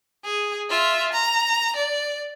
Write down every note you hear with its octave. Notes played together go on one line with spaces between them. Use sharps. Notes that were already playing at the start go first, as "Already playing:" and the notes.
G#4
F4 E5
A#5
D5